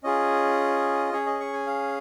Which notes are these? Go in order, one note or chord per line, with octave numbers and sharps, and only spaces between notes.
C#4 F4 G#4 D#5
C#4 G#4 C#5
D#5
C#6
G#5
F5